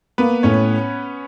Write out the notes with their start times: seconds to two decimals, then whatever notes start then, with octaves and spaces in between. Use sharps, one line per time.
0.18 A#3 B3 B4
0.43 A2 C#4 C#5